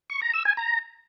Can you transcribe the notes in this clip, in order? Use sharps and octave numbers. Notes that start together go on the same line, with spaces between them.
C#6
A#5
E6
G#5
A#5